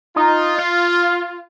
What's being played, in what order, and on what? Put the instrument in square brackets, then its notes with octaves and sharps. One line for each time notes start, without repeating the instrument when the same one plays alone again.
[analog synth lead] D#4 [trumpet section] F4
[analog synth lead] F5